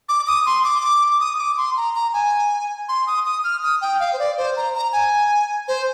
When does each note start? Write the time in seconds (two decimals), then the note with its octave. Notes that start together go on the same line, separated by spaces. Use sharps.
0.09 D6
0.27 D#6
0.46 C6
0.64 D6
1.20 D#6
1.39 D6
1.58 C6
1.77 A#5
1.95 A#5
2.14 G#5
2.89 C6
3.07 D#6
3.25 D#6
3.44 F6
3.63 D#6
3.81 G5
4.00 F5
4.13 C5
4.19 D5
4.37 C5
4.57 A#5
4.75 A#5
4.93 G#5
5.68 C5